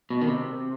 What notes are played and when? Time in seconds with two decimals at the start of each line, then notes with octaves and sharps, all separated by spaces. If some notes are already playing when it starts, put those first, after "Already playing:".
0.10 B2
0.22 D#3
0.28 C3